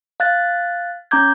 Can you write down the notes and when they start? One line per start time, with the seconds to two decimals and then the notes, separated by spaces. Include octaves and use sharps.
0.20 F5 F#6 A6
1.11 C#4 A#5 D6 G6 G#6